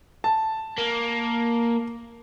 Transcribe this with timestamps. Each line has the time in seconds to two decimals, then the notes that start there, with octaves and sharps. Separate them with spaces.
0.24 A5
0.78 A#3